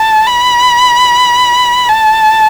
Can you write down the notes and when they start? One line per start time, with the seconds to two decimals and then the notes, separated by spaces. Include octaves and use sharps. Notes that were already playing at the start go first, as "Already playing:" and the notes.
Already playing: A5
0.26 B5
1.89 A5